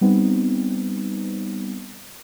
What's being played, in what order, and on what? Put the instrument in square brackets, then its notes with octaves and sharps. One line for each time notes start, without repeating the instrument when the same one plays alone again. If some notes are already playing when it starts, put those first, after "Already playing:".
[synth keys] G3 B3 C4 D#4